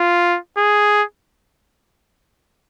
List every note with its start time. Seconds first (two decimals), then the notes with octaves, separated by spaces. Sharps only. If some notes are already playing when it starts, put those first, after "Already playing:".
Already playing: F4
0.57 G#4